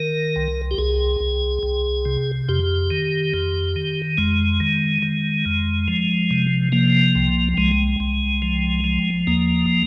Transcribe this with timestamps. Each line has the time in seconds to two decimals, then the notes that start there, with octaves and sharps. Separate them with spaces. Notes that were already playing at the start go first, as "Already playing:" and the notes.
Already playing: D#3 A#4
0.36 C2
0.71 G4
0.78 C2 G#4
1.20 C2
1.63 C2
2.05 C3
2.49 F2 G4
2.91 D#3
3.34 F2
3.76 D#3
4.18 F2 G#3
4.60 D#3
5.02 D#3
5.46 F2
5.88 F3
6.31 C3
6.72 F3 A#3
7.15 C2
7.57 C2 G#3
8.00 C2
8.42 F3
8.84 F3
9.27 D#2 A#3